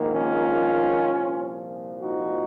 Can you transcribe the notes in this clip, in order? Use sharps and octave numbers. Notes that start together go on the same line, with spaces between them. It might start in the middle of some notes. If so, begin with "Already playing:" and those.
Already playing: A#1 G#2 D#3 A#3
C#4 F4
C2 A#2 F3
D#4 F#4